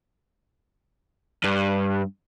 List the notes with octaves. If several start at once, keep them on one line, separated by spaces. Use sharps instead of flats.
G2